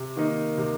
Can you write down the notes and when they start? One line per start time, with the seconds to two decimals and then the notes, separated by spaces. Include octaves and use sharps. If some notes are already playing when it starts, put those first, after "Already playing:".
Already playing: C3
0.16 D#3 A#3 D#4
0.57 C3